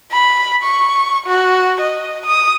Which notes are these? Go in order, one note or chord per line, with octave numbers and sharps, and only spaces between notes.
B5
C#6
F#4
D#5
D#6